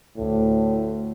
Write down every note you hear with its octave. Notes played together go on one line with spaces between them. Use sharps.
D2 A2